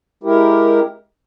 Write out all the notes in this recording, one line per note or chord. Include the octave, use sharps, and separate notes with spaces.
G#3 E4 G4 A#4